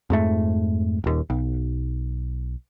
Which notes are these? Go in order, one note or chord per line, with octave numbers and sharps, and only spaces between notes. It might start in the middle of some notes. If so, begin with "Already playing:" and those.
F2 G#2 A3
D#1 D#2
B1